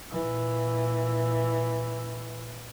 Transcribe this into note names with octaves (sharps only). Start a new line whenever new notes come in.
A#2 E3